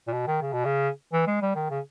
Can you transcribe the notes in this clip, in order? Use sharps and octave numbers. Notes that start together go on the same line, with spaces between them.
A#2
B2
D#3
C#3
B2
C#3
E3
G#3
G3
D#3
C#3